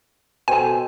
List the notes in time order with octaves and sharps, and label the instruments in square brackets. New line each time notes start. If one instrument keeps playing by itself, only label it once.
[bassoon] B2 [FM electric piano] A4 C5 G5 [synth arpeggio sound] G#5